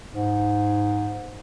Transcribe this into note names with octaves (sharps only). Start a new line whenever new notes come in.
G#2